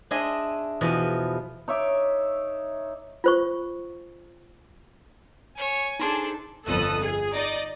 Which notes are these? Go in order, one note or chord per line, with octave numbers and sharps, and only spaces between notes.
D4 G#4 D#5 E5 G#5 C6
E2 B2 F3 B4 D#5
D#4 C#5 E5 D6
F4 C5 C#6
C#5 G#5
D4 D#4 G#4 A4 C5 A#5
G1 F2 A4 D#6 F#6
G#4
D#4 D5 D#5